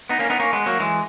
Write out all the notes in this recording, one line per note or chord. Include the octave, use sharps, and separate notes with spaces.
B3 D#4
A#3 C#4
B3 D#4
A#3 C#4
G#3 B3
F#3 A#3
E3 G#3